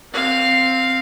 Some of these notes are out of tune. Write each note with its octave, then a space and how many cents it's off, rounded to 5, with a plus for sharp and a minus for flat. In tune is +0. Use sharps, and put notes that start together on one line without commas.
C4 +0 F5 +0